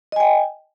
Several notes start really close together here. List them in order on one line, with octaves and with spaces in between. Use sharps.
D#5 G#5 G5